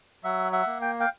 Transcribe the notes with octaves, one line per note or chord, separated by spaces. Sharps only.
F#3 E5 F#5
E5 F#5
A#3
G5
F5 G5